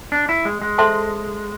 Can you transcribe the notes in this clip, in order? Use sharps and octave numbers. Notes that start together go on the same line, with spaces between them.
D4
E4
G#3
G#3
A4 C5 E5 A5 C6